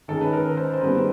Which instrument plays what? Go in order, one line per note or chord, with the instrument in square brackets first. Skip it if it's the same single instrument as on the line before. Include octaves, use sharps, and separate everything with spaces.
[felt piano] D#3 G#3 C#4 [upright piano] A4
[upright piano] B4
A#4
C5
C5
[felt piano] D#3 G3 B3 [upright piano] B4